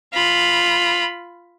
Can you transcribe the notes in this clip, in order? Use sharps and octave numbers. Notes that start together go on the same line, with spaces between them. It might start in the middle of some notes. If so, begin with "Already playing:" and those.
F4 B5